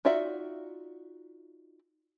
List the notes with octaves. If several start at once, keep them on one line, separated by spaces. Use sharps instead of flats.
D#4 F4 F#4 D5 E5